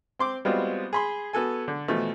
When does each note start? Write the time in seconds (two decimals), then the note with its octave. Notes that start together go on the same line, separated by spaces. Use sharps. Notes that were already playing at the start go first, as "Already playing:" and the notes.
0.19 C4 C6 D6
0.45 G3 G#3 B3 C4 F4 F#4
0.93 G#4 B5 C6
1.33 B3 F#4 A4 G#5
1.68 D3
1.88 B2 E3 F3 A3